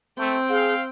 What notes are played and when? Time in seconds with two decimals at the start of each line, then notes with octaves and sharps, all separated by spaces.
0.18 A3 C4 G5
0.50 G#4 F5